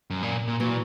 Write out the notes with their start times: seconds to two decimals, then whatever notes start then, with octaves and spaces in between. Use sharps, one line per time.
0.10 F#2
0.23 A#2
0.48 A#2
0.60 A#2 E3 F#3